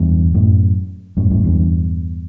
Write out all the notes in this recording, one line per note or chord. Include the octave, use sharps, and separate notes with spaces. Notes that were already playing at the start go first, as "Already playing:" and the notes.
Already playing: E2 G2
F#2 A2
F#2 A2
F#2 A2
E2 G2